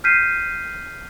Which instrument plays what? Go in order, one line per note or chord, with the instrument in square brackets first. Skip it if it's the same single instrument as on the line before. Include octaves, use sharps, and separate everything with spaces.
[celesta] F6 G6 B6 C7 D#7